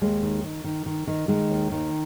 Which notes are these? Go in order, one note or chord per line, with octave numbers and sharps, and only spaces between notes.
D#2 G#3
D#3
D#3
D#3
D#3
D#3
D#3 G#3
D#2
D#3